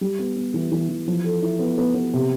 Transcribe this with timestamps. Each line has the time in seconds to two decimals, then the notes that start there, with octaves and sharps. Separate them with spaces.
0.01 G3
0.19 B3
0.36 B3
0.54 E3
0.72 E3
0.89 E3
1.08 F3
1.24 A4
1.42 E4
1.59 B3
1.78 B3
1.95 B3
2.13 C3